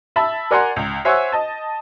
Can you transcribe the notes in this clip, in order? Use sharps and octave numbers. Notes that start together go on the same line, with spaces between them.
E5 A5 B5
A#4 D5 F#5 G#5 A#5 C6
C#2
C5 C#5 E5 F#5 G#5
D#5 A5